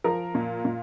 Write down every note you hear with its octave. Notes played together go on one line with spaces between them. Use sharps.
F3 A#4
A#2
A#2